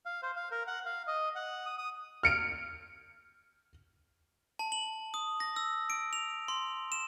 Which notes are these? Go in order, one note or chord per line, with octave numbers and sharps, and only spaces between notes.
F5
C5
F5
A#4
F#5
F5
D#5
F#5
D#6
D#6
F6 C#7 D7
A5
F#7
D#6
A#6
E6
D7
F7
C6
E7